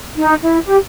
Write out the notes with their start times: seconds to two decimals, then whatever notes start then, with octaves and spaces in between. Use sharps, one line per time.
0.18 D#4
0.41 E4
0.65 G4